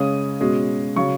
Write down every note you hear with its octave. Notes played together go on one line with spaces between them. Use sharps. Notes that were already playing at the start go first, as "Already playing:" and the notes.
Already playing: C#3 G#3 C#4 D#6
B2 G#3 C#4
C#3 F#3 C#6